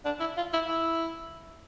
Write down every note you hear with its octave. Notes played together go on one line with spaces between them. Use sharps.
D4
E4
F4
E4
E4